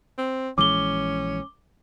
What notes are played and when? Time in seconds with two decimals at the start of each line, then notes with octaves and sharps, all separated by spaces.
0.18 C4
0.58 A#1 E3 G#3 C#4 D6 G7